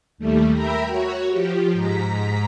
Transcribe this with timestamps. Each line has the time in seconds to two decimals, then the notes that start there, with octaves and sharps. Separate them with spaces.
0.18 D#2 G3 A3
0.52 A#4 E5 G5 A#5 B5
0.86 F#4 C#5
1.29 F3 G4
1.73 G#2 A#5 B6